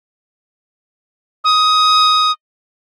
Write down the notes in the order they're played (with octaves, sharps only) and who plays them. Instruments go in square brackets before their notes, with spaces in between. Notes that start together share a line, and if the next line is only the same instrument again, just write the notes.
[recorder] D#6